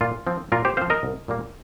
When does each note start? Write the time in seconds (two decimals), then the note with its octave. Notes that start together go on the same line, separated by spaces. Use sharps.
0.01 A#2 F4
0.27 F3 C4
0.52 A#2 F4 A#4
0.65 G4 C5
0.77 F3 C4 C5 F5
0.90 A#4 D#5
1.03 C2
1.28 A#2 G3 A#3